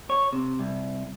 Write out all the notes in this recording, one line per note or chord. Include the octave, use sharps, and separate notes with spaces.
C#5
C3
C2